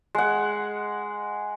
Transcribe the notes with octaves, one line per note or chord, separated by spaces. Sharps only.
G#3 F#5